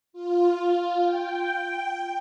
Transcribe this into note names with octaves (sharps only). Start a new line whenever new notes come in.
F4
G5